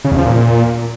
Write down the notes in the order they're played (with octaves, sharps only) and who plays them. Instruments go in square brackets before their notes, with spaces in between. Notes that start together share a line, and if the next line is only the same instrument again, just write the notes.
[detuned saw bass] C#3
E2
F3
A#2